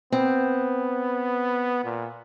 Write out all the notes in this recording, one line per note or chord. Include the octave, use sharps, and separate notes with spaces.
B3 C4
A#2